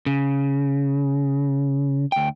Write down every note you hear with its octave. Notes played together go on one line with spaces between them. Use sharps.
C#3
D2 G5